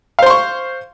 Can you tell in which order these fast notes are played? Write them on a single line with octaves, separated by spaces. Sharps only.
F5 C5 C6 C#6